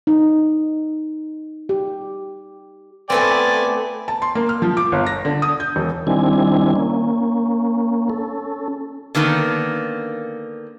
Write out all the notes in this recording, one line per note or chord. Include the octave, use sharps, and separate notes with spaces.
D#4
G4
A3 B3 C4 D5 G#5
A5
C6
A#3
F6
F3
D6
G1
A#6
D3
D#6
G6
E1
D#3 G3 C4 D4 E4 G#5
A#3 C#4
C#4 A4
D3 D#3 A#3 B3